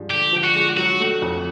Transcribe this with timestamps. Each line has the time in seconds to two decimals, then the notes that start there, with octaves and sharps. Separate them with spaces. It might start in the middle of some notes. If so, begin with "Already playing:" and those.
Already playing: G2 F3 G#3
0.10 D3 G4
0.33 F3
0.44 F#4
0.55 G#3
0.77 F#3 F#4
1.00 A3
1.22 F2